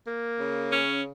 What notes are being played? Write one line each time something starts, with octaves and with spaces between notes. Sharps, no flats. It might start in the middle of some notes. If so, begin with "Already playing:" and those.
A#3
C#3
C#4